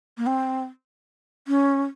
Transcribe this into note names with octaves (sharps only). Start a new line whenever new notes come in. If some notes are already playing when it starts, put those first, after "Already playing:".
A#3
C4
C#4